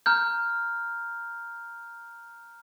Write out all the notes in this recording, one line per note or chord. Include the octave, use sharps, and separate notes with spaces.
A#5 F6 G6